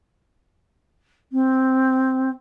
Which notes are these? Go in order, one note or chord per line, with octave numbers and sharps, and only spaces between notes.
C4